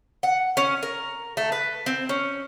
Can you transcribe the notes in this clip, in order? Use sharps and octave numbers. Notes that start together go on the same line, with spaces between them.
F#5
C#4
A#4
A3
B4
C4
C#4